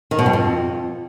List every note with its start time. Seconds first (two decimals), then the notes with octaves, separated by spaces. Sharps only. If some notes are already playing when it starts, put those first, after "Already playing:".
0.11 D#3
0.19 B2
0.26 G2
0.33 F2